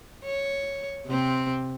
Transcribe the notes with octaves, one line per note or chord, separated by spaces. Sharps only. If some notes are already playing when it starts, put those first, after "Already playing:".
C#5
C3 C4